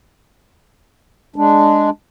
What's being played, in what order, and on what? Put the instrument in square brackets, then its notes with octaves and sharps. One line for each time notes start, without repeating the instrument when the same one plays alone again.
[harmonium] G#3 D4